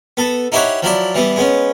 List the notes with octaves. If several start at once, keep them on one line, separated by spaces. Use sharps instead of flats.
B3 A4
D#4 E4 G4 C5 C#5 F#5
F3 F#3 E4 D5
E3 G3 B3
G#3 B3 C#4